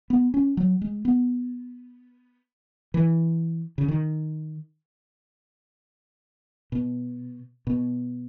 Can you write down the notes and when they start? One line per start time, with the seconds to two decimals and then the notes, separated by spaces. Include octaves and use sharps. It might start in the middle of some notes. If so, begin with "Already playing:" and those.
0.10 B3
0.34 C#4
0.57 F#3
0.81 G#3
1.05 B3
2.94 E3
3.78 C#3
3.88 D#3
6.72 B2
7.67 B2